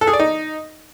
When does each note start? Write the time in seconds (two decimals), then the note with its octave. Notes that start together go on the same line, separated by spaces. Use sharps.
0.01 A4
0.07 G#4
0.13 D5
0.19 D#4